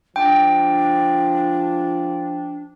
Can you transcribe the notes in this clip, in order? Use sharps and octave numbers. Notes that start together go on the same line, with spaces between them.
F3 D4 G5